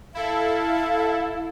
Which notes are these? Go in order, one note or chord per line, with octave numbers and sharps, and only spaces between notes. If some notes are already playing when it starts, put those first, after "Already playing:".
E4 A4 F5